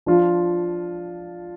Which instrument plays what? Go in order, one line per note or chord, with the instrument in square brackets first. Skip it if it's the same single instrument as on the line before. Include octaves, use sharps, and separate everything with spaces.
[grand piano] F3 D4 F4